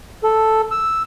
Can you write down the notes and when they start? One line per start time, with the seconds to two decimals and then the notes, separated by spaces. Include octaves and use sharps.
0.24 A4
0.71 E6